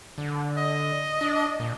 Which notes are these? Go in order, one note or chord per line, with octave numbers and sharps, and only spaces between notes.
D3
D#5
D4
A#2